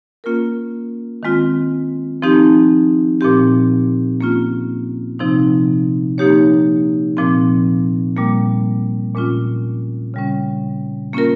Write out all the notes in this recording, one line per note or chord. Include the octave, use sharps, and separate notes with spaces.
A#3 C#4 F4 A#4
D#3 G#3 C4 F4
F3 C4 D#4 G4
A#2 F3 C4 G4
A#3 C#4 F4
C3 F3 C4 D#4
F3 A#3 D#4 G4 C#5
A#2 F3 C4
A#2 G3 A#3
A#2 G#3 C#4 F4
C#3 G3 C#4
A#3 C#4 F4 A#4